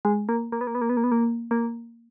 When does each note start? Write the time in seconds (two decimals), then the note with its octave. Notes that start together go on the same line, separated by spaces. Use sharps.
0.05 G#3
0.29 A#3
0.52 A#3
0.61 B3
0.67 A#3
0.75 B3
0.81 A#3
0.89 B3
0.97 A#3
1.04 B3
1.12 A#3
1.51 A#3